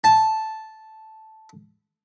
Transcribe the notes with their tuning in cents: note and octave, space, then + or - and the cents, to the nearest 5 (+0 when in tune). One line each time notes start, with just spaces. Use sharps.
A5 -5